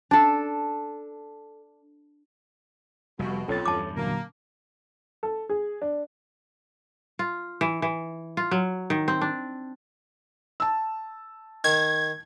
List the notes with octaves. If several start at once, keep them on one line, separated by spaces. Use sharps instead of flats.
D4 A4
F1 B2 G3
B1 F2 C#4 A4 C#5 A6
E2 G2 A5 D6
A#2 D3 F#3 A#3
A4
G#4
D4
F4
E3
E3
F4
F#3
D#3
C4
D4
A5 E6
D#3 G#6